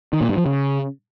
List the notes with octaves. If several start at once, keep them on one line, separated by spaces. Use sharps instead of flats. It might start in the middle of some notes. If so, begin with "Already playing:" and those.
D#3
A#2
G2
F3
C#3